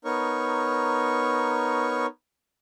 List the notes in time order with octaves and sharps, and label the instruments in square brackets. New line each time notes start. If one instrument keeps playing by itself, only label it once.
[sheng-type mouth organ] B3 D#4 A#4 C#5 C#6